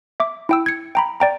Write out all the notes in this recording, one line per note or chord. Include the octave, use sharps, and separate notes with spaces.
E5 D6
E4 G5 E6
G#6 C#7
G5 A#5 B5
D5 G5 A#5